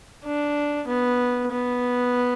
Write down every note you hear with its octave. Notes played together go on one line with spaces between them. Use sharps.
D4
B3
B3